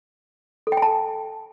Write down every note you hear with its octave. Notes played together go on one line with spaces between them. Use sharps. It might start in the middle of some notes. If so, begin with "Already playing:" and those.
A4
G5
G#5
A5